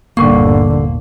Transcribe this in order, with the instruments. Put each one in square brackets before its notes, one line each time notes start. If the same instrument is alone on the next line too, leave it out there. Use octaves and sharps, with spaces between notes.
[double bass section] G1 [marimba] D#2 A#2 C#6 [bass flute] D3 [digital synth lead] A#3